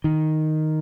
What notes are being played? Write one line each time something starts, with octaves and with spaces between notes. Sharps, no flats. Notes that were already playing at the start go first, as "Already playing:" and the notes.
D#3